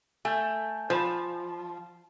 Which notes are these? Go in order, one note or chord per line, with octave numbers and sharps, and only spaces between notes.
A3 G#5 G6
F3 C5 A5 B5